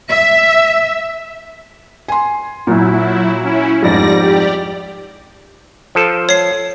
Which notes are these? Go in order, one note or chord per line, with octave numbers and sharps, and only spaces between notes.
E5
G#5 C6
A#2 F#3 E4
C#4 E4
F2 G#2 F3 G3 D5 A#6
G4 D5
F3 A4
C#5 C7